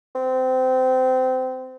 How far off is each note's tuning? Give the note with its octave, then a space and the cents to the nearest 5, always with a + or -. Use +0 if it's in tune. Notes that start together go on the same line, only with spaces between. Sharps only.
C4 -25